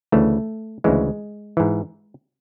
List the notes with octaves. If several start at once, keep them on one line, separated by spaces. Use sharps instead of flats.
D2 C#3 E3 A3
D2 C#3 E3 G#3
G#2 E3